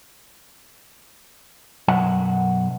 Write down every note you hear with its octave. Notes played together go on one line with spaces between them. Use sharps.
B1 F#2 F#5